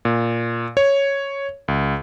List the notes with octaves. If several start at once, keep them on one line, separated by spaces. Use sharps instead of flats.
A#2
C#5
C#2